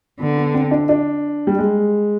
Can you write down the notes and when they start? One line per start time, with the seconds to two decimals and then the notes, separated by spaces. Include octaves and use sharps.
0.20 D3 B3
0.37 B3
0.54 C4
0.71 D4
0.89 D4
1.47 G3
1.59 G#3